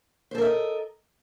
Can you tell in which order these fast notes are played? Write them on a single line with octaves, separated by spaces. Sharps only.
C5 A4 A#4 E5 D#5